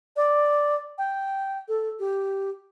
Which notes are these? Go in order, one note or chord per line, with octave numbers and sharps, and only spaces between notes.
D5
G5
A4
G4